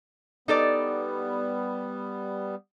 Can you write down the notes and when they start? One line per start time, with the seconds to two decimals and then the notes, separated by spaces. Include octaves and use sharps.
0.48 G3 B3 D#4 A4 D5